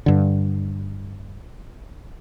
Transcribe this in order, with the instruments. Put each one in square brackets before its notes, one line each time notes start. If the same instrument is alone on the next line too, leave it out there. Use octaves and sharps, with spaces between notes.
[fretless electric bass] G2 D3